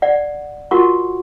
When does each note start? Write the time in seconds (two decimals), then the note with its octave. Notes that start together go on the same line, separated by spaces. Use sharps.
0.02 D5 F#5
0.71 F4 F#4 A#4 F#5 C#6